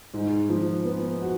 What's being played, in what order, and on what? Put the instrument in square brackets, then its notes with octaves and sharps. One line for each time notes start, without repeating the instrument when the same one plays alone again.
[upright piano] G#2
F3
B3
F#4